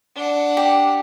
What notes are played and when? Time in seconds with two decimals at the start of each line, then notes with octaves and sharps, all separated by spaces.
0.15 D4 F#5
0.57 G4